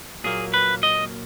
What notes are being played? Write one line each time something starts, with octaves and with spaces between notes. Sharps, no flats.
A#2 F#3 A#3 G#4
B4
D#5